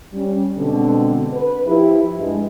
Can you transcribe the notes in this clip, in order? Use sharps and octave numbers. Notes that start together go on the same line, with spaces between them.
G3 C#4
B2 D3 G#3 C4
B4
F3 E4 G4
G2 G#3